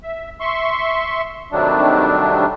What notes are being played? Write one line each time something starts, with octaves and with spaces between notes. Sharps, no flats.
E5
E5 C6 C#6
C3 D#3 F#3 G3 A3 D4